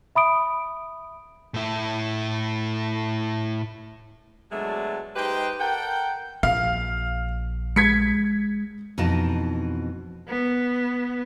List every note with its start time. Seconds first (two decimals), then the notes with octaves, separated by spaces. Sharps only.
0.15 E5 B5 D#6 D7
1.54 A2 E4
4.52 B2 F#3 G#3 A3 D4
5.16 G#3 D#4 G4 B4 C5 G5
5.60 A4 A#4 F#5 G5
6.43 A#1 F5
7.76 G#3 G#6 B6 C#7
8.98 F2 B2 E3 D#4 A5
10.29 B3